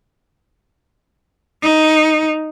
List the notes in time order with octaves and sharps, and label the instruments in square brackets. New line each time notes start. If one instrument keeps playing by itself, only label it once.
[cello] D#4